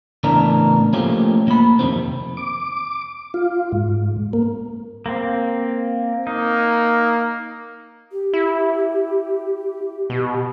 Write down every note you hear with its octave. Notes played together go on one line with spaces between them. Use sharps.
C#2 A2 E3 B3 D4 A#4
F3 A3 A#3 C4 C#4 G4
A#3 B5
F2 C3 D#3 C4
D6
F4
G#2
A#3
A#3 C4
A#3 D#4
G4
E4
B2